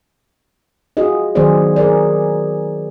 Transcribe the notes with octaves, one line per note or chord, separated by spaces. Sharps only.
F4 F#4 G#4 D#5
D#3 F#3 B3 G#4 C5 D5
G#4 A#4 D5